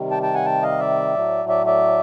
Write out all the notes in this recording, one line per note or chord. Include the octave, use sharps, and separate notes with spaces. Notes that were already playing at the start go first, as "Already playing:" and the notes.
Already playing: C3 D#3 G3
G5 A5
G5 A5
F#5 G#5
G5 A5
D#5 F5
D5 E5
A2 F#3 A3
D5 E5
D5 E5